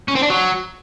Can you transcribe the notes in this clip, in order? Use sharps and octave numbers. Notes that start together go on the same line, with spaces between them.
C#4
C4
D4
F#3